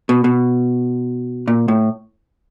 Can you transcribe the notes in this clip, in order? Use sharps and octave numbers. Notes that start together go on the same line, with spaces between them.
B2
B2
A#2
A2